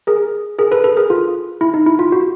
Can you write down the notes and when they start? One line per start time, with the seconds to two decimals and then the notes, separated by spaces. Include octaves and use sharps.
0.07 G#4 A#4
0.59 G#4 A#4
0.72 A4 B4
0.84 A4 B4
0.97 G#4 A#4
1.10 F4
1.61 E4
1.74 D#4
1.87 E4
1.99 F4
2.12 F#4